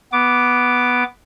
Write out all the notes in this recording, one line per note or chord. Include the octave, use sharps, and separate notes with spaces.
B3 D6